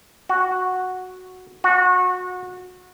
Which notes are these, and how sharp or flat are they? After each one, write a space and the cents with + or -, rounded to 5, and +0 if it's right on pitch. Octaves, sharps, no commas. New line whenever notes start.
F#4 -5
F#4 -25